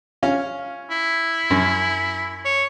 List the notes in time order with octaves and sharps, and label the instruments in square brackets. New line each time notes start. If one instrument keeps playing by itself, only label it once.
[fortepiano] C#4 F4
[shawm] E4
[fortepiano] F#2
[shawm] C#5